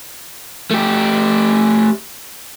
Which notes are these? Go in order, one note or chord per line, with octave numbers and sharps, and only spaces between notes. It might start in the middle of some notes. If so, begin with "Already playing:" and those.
A3 G4